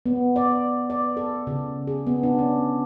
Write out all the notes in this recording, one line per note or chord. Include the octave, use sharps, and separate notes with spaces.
B3
D5
D5
A4
C#3
G#4
B3
D4
C#4